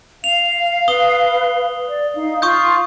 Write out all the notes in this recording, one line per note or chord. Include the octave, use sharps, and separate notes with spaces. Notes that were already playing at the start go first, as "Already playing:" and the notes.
F5 F7
B4 D#6 G7
D5
D#4 F5
F4 C6 C#6 D#6 G6